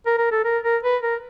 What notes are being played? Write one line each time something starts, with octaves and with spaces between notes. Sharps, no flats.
A#4
A#4
A4
A#4
A#4
B4
A#4